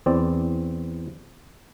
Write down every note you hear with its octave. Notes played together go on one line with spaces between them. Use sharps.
E2 C4 D5